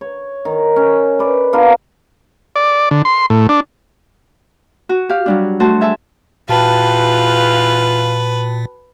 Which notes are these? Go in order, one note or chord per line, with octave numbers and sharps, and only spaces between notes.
C#5
D#3
C#4
B4 D5
B3 D4 F4 A#4
D5
D3
C6
A2
D4
F#4
G4 F5
F#3 G3 D4
A3 F#4 C5 A5
G#4 E5 A5 E6
E2 A#2 F4 F#4 B4 G5 A5